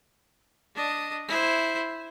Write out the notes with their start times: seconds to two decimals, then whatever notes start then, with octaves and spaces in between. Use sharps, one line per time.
0.75 D4 D#5
1.28 E4 C5